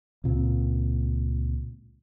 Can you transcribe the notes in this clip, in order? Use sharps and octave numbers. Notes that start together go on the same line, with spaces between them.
C#2 A#2 C4